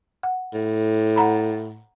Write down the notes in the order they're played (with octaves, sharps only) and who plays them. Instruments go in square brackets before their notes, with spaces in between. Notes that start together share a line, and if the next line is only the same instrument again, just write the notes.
[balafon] F#5
[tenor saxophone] A2
[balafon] F#5 A#5 B5